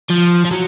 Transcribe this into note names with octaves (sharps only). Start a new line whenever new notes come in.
F3
F3
F#3